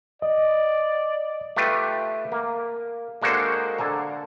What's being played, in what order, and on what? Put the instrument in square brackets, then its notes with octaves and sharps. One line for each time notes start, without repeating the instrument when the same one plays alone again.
[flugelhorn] D5 [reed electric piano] D#5
[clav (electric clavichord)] A3 F4 G4 B4 A5
A#3
G#3 A#3 D4 F#4 A4 C5
D3 A4 G#5 A#5